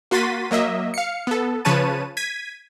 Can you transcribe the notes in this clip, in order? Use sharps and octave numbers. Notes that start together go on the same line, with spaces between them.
A#3 F#4 C6 A6 B6 D#7
F#3 A#3 D#5 E5
F5 C#7
B3 A4
C#3 F3 B4 C#5 A5 D#7
G#6 B6 D#7